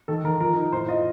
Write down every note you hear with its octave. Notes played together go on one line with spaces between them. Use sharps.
D#3 A4
D#3 A#4
F3 A#4
D#4
A2 C5
F4 D#5